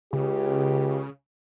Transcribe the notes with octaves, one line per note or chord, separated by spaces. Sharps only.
C#2 C#3 G4